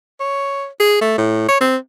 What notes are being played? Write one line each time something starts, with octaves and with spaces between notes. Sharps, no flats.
C#5
G#4
A3
A2
C#5
C4